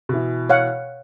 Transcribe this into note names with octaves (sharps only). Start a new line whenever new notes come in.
B2 E3
C#5 F5 F#5